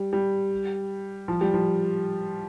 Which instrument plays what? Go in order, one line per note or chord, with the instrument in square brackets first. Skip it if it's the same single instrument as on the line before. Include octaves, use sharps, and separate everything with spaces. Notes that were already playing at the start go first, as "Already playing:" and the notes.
Already playing: [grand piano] G3
G3
F3
G3
F3